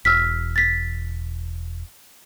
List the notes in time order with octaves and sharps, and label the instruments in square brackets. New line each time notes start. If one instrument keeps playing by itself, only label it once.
[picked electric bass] E1 [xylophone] E6 F6 B6
[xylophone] A6 B6